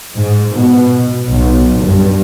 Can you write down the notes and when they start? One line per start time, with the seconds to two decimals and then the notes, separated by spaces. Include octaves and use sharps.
0.15 G#2
0.52 B2
1.28 B1
1.83 G2